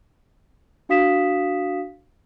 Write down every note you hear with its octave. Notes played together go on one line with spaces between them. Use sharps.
D4 F#4 F5 D#6 B6 E7